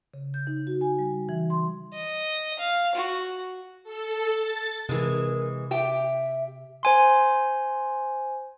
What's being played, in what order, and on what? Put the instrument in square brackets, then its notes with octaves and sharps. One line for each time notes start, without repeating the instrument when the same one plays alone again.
[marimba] C#3
G6
D#4
F#4
G#5
G3
E3
C6
[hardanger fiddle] D#5
F5
F#4
[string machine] A4
A6
[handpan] C3 [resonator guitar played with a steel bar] E3 G#3 [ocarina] A#4
[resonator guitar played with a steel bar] G4 G5 [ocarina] E5
[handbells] C5 G#5 C6